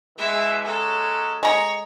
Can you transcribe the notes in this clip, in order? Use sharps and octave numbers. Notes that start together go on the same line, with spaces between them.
B2 E3 G#3 E5
F#3 G#3 C#4 A4
G#3 C#5 A#5